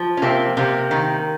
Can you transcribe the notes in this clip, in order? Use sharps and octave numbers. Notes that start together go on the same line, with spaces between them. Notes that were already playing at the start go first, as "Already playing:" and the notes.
Already playing: F3
C#4
C3 A#3 C4
C3 A#3
D#3